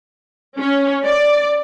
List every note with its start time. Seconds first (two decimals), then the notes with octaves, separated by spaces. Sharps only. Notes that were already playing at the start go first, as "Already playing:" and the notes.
0.58 C#4
1.04 D5